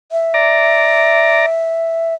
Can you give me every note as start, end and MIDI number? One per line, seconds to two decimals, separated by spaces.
0.12 2.14 76
0.34 1.46 74
0.34 1.46 82